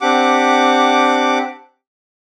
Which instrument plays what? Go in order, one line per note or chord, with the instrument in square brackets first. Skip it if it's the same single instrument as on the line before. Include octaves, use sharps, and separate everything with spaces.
[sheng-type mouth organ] C4 D4 G4 F#5 D6